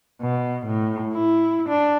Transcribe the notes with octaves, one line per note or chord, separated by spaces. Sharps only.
B2
A2
E4
D4